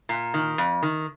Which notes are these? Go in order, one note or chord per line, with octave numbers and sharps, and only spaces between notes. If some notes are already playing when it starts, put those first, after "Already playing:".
A#2
D#3
F2
D#3